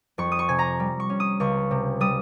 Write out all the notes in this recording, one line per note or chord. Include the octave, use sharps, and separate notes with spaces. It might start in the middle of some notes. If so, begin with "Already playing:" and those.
F2 C#6
D#6
C#6
C3 G#5
A#5
G3
C#6
C#4
D#6
C#2 C#6
C3
G3 D#6